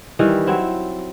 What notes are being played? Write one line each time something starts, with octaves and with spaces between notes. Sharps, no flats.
D#3 E3 G3
F#3 C4 E4